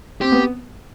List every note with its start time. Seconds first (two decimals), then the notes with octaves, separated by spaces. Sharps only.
0.21 C4 G4
0.32 B3